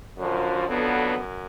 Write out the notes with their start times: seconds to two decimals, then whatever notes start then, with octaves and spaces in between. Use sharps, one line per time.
0.18 F#2 D3 F3
0.68 F2 D3 F#3 B3
1.18 F#2